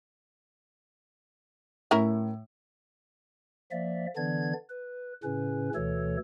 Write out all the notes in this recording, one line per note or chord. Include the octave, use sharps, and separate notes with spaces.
A2 C#4 E4 A#4
F3 A#3 D5 E5
D3 E3 B3 D4 D5 G#6
B4
A2 C#3 C#4 B4
D2 B2 E3 A3 A4 C#5